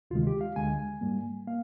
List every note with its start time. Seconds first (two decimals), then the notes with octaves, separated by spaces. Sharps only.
0.11 D2 C3 D#3 G#3 F4
0.27 G4
0.41 F5
0.56 D2 D3 G#3 G#5
1.01 G#2 G3 A#3
1.47 A#3 F5